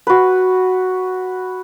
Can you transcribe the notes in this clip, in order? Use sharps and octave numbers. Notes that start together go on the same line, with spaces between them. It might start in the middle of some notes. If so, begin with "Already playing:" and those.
F#4 B4